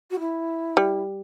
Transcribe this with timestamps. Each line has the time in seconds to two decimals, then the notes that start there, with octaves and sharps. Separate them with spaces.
0.11 F#4
0.19 E4
0.77 G3